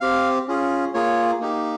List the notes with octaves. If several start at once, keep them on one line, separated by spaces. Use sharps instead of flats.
C4 G4 F5
C#4 F4 G#4
A#3 F4 G#4 C#5
A#3 D#4 G4